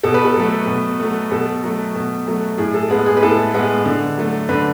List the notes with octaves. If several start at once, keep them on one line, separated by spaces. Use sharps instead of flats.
B2 A4
B4
A4
F#3 A3
B2
F#3 A3
B2 A4
F#3 A3
B2
F#3 A3
A2 G#4
A4
G#3 B3 G#4
G#4
B4
A2 A4
G#3 B3
D3
F#3 A3
D3 B4